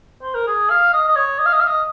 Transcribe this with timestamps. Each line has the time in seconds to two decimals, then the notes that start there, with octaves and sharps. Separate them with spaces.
0.22 C5
0.34 A#4
0.47 G#4
0.70 F5
0.93 D#5
1.08 D#5
1.16 C#5
1.39 D#5
1.46 F5
1.53 D#5
1.60 F5
1.67 D#5